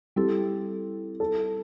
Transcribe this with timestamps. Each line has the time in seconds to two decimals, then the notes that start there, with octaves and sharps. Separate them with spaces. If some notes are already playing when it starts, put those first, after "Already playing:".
0.16 G3 C4 E4 G4 A4
1.20 A4